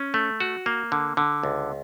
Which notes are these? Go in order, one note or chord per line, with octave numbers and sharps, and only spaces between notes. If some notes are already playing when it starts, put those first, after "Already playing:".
Already playing: C#4
A3
F#4
A#3
D3
D3
C#2